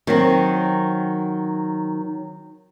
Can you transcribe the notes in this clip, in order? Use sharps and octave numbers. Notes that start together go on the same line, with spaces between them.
D#3 F#3 C4